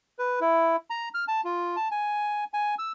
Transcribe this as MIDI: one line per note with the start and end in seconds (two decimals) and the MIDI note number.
0.19 0.40 71
0.41 0.76 64
0.90 1.09 82
1.14 1.25 89
1.28 1.41 81
1.45 1.76 65
1.76 1.88 81
1.91 2.44 80
2.54 2.75 80
2.79 2.92 88